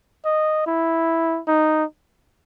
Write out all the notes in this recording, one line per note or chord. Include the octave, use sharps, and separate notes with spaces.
D#5
E4
D#4